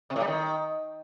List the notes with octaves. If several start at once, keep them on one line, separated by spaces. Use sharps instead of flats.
C3
A2
G3
D#3